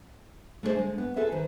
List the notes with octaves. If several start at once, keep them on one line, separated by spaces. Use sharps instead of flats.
A3 D4 E4 G#4 C5 D#5
D3 G#3
B3
F4 G#4 A4 B4 E5
D#3 B4 C5